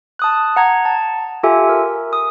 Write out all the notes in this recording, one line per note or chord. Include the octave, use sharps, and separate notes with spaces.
A5 D#6 F#6
F#5 A#5 G#6
A5
F4 G4 A4 E5 G#5
A#4
D#6